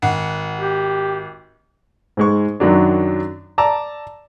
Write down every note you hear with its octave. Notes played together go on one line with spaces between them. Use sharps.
G#1 F#5
G4
G#2 G#3 C#6
F#2 D#3 F#3 D4
D5 A5 A#5 E6